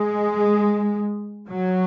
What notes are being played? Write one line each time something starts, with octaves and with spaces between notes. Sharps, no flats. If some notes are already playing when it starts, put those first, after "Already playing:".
Already playing: G#3
F#3